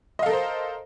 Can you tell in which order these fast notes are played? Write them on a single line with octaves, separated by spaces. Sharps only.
D#5 F5 A4 A#4 C5